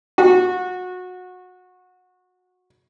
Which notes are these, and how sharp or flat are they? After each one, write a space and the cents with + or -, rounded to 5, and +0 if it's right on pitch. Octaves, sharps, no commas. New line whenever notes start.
F#4 -25